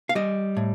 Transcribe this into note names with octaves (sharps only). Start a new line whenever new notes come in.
F5
G3 D#5
A2